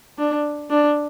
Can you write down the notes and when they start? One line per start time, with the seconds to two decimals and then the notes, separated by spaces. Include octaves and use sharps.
0.18 D4
0.70 D4